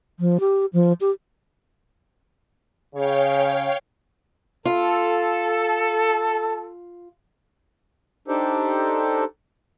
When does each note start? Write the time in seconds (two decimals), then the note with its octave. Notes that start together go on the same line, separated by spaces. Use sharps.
0.20 F3
0.40 G4
0.73 F3
1.01 G4
2.95 C#3 C#5 F5 G5
4.65 F4 A4
8.28 D4 D#4 G4 A4 C5